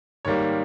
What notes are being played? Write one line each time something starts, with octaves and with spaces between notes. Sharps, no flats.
G#2 D#3 G3 A#3 C#5